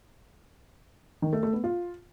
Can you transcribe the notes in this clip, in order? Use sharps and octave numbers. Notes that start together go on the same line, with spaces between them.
D#3
A3
A3
B3
F4